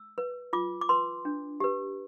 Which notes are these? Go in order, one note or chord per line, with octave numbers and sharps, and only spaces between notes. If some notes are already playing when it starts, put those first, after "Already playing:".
Already playing: E6
B4
F4 D6
D6
B4 C6
D4
G4 B4